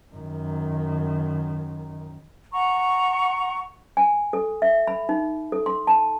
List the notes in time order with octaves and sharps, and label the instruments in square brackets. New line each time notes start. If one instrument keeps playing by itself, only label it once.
[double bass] F#2 D#3
[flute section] F#5 A#5 C#6
[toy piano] G#5
A4
E5
B5
D#4
A4
C6
A5